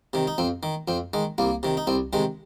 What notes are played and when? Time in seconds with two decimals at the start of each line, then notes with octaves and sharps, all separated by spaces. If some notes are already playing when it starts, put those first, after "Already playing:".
0.13 C3 D#3
0.27 D#4
0.38 F2 C4
0.63 D#3
0.88 F2 C4
1.14 D#3 G#3
1.38 C2 A#3
1.63 C3 D#3
1.77 D#4
1.87 C2 C4
2.13 C3 D#3 G#3